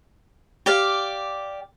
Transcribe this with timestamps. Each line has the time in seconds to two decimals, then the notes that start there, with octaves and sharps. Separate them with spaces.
0.66 G4 D5 F5